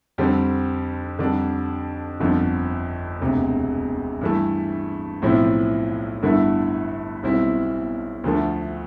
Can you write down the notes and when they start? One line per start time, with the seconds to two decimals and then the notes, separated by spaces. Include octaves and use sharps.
0.18 F2 D3 G3 C4
1.19 F2 D3 G3 D4
2.20 G1 F2 D3 F3
3.21 E1 D2 C3
4.21 G2 E3 A3
5.22 B1 A2 F3 C4 E4
6.22 G1 G2 D3 A3 E4
7.23 B1 B2 G3 C4 E4
8.24 D2 D3 F3 A3